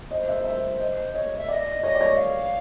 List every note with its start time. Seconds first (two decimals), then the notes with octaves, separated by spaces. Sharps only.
0.11 C#5 D#5
0.15 C5
0.28 E5
0.45 E5
0.80 D#5
1.13 C#5 D#5
1.37 E5
1.48 D5 E5
1.53 D#5
1.83 C#5 D#5
1.95 D5
2.01 C#5
2.17 F5